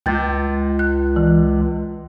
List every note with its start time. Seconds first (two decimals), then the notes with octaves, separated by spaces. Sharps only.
0.06 C#2 G5 G6 A6
0.79 F#6
1.16 E3